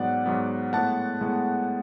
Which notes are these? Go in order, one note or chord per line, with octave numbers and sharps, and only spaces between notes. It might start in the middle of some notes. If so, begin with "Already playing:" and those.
Already playing: G#2 F#3 B3 D5 F#5
G#2 F#3 B3
A2 G#3 B3 F#5 A5
A2 G#3 B3